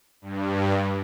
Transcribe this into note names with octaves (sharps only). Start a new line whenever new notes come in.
G2